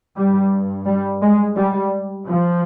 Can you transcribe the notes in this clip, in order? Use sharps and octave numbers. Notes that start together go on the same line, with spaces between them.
G2 G3
G3
G#3
G3
F3